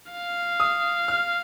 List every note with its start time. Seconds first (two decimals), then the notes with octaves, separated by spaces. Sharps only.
0.12 F5
0.60 D#6
1.08 F6